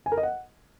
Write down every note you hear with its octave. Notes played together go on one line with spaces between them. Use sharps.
G#5
A#4
D#5
F#5